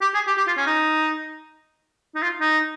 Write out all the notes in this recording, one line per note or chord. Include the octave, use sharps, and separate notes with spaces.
G4
G#4
G4
G4
F4
C#4
D#4
D#4
F4
D#4